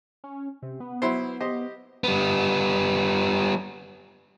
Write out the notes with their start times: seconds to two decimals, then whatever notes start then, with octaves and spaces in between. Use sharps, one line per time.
0.24 C#4
0.63 C3
0.80 B3
1.02 F#3 E4 C5
1.40 G4 C5 D#5
2.04 G3 B3